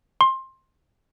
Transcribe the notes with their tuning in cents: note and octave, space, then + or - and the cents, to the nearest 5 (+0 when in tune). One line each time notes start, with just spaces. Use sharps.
C6 +20